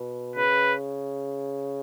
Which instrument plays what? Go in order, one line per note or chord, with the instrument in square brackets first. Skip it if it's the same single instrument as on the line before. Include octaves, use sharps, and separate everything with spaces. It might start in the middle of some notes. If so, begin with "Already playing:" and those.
Already playing: [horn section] B2
[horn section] C#3 [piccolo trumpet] B4